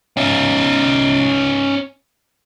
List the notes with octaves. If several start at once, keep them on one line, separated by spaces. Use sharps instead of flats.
C#4 D#4